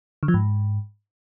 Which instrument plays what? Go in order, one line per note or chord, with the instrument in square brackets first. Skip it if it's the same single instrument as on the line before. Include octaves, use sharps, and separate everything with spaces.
[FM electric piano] D3
F3
G#2